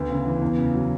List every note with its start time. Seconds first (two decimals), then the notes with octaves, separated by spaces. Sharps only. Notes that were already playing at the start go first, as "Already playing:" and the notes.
Already playing: D2 B3
0.10 C#3
0.26 E3
0.42 E2
0.58 C#3
0.75 F#3